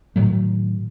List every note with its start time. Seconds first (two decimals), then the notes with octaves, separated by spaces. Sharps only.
0.16 A2 D#3 F#3 A3